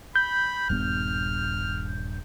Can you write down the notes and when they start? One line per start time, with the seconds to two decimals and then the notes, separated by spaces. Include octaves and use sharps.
0.16 B5 G6
0.70 D#1 G2 B3 F6